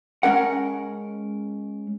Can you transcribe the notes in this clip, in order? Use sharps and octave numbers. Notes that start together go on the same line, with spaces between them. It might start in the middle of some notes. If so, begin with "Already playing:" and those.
G#3 C#4 A#4 F#5